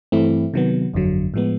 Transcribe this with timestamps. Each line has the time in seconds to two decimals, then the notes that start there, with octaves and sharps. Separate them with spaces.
0.12 G2 E3 A3 C4 E4
0.54 C3 D#3 F#3 B3
0.94 G1 F2 D3 F#3
1.34 A2 F3 G#3 B3